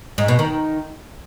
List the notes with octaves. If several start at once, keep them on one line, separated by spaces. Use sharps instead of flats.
G#2
B2
D#3